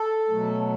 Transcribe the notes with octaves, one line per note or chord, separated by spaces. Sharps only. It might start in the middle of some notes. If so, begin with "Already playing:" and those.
Already playing: A4
B2 F#3 A3